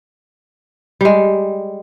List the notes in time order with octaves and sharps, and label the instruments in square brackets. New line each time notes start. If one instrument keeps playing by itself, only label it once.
[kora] G3 G#3